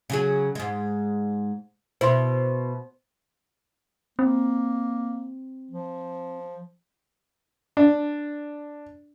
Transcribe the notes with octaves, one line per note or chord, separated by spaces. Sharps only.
C#3 F#3 G#4
G#2 G#3
B2 E4 C5 C6
A#3 C4
F3
D4